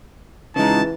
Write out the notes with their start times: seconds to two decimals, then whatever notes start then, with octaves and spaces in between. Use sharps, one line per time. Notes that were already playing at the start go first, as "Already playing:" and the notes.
0.56 C#3 E3 G#3 D#4 A5